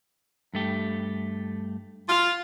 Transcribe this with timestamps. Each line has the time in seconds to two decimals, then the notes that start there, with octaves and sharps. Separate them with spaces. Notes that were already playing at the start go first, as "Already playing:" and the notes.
0.54 G2 A3 G4
2.09 F4